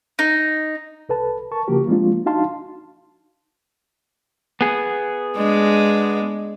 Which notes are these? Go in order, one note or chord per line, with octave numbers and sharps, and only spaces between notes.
D#4
C2 A4 B4 A5
A#4 A5 C#6
C#3 F3 A#3 F#4 G4 A#4
F3 G#3 A#3 C4 D4 F4
D4 D#4 F#4 F5 A5 C6
B3 G#4
G#3 D4